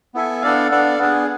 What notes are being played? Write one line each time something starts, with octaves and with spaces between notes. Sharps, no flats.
B3 E4 A4 E5 G#5
B3 D4 A4 D5 F5
B3 D4 A4 D5 F5
B3 D4 G#4